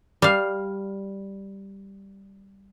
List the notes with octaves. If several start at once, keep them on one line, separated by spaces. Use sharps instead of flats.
G3 F5